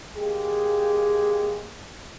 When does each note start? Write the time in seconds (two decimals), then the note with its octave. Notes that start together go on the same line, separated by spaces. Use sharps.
0.17 G#3 A#3 G4 G#4